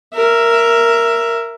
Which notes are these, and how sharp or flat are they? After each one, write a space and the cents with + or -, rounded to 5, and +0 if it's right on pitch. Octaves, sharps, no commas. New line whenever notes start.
A#4 +0 E5 +15